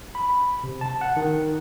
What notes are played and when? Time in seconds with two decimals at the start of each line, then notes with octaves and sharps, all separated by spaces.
0.15 B5
0.63 C3
0.81 A5
1.01 F#5
1.16 D#3